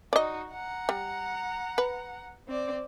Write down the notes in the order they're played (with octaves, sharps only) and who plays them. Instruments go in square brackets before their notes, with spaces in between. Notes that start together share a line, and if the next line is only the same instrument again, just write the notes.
[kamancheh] D#4 F#4 [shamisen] D5 D#5
[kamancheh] F#5 A#5
[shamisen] G3
B4
[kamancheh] C4 D5